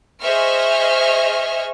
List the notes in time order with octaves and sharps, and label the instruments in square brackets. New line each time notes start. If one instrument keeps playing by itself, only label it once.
[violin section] G#4 C5 D#5 E5 C#6 F6